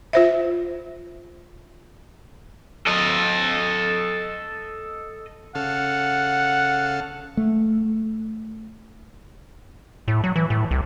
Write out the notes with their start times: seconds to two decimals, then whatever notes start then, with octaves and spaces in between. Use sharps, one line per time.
0.13 F4 C5 E5
2.87 A4 D#5
5.55 C#3 A4 F5 F#5
7.37 A3
10.08 A2
10.24 F#3
10.36 E3
10.50 A2
10.71 C2